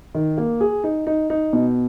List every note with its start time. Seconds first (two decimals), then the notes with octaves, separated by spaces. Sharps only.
0.15 D#3
0.38 A#3
0.61 G#4
0.84 D#4
1.07 D#4
1.30 D#4
1.53 B2